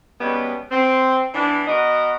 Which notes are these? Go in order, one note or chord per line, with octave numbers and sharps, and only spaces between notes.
B2 G3 G#3 B3 C#4
C4
E3 B3 D4
B3 F#4 A#4 D#5